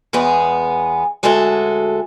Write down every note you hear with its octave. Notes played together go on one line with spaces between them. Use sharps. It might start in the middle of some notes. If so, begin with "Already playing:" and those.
E2 G#3 B3 G#4
D2 G#3 F#4 G#4 A4 E5